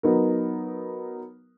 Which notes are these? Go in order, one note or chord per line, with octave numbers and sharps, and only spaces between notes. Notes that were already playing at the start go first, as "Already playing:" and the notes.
F#3 B3 D#4 A#4